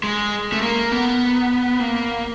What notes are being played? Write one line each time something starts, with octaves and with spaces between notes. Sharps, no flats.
G#3
A3
A#3
B3
A#3